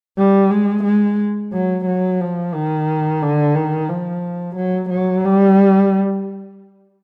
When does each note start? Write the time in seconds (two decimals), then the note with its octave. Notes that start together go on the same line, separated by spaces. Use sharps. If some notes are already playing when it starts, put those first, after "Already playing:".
0.18 G3
0.51 G#3
0.84 G#3
1.53 F#3
1.86 F#3
2.21 F3
2.55 D#3
3.22 D3
3.55 D#3
3.89 F3
4.57 F#3
4.91 F#3
5.25 G3